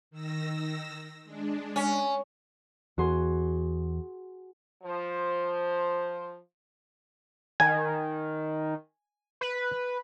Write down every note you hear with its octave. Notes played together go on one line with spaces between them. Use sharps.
D#3 E6 A#6
G#3 D4
C#4
E2 F#4 G#4 C6
F3 C5
D#3 G#5
B4